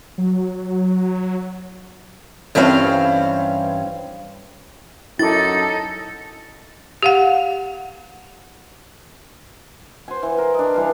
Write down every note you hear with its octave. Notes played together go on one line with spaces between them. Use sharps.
F#3
G2 E3 C4 C#4 F5
F#2 D#4 E4 A4 D6 A6
G4 F5 F#5
C5 F#5 G#5
E3
A#4 B4
D4 D#5
E3 G3 F5